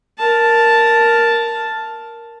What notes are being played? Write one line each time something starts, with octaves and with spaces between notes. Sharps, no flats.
A#4 A5